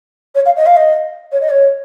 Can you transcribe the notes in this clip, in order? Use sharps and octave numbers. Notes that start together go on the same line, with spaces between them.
C#5
F5
D#5
F5
D#5
C#5
D#5
C#5